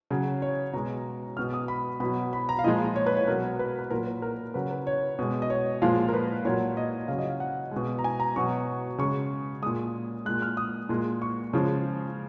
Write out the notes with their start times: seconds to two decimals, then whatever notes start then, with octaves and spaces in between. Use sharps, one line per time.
0.11 C#3 F#3
0.42 C#5
0.73 B2 G#3 A#5
1.37 B2 G#3 F6
1.54 D#6
1.68 B5
2.00 B2 F#3 B5
2.33 B5
2.49 A#5
2.59 F5
2.64 A#2 F3 G#3 D#5
2.96 C#5
3.06 B4
3.17 C#5
3.28 B2 F#3 A#4
3.59 B4
3.79 B4
3.90 A#2 F#3 A#4
4.07 B4
4.22 A#4
4.54 C#3 F#3 B4
4.71 B4
4.87 C#5
5.19 B2 G#3
5.42 D#5
5.50 C#5
5.82 A#2 F3 G#3 F5
6.08 A#4
6.14 B4
6.45 A#2 F#3 C#5
6.77 D#5
7.08 C#3 F#3 F5
7.18 D#5
7.29 F5
7.40 F#5
7.71 B2 G#3
7.99 A#5
8.04 G#5
8.20 A#5
8.36 B2 F#3 C#6
8.98 C#3 G#3 C#6
9.62 A#2 G#3 D#6
10.25 A#2 G#3 F#6
10.42 F6
10.57 D#6
10.89 A#2 G#3
11.22 C#6
11.53 C#3 F3 G#3